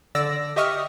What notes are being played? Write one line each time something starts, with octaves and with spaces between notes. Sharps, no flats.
D3 D5 E6 A#6
G4 D#5 E5 C#6 D#6 F6